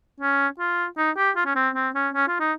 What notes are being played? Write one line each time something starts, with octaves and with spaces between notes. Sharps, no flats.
C#4
F4
D#4
G4
F4
C#4
C4
C4
C#4
C#4
F4
D#4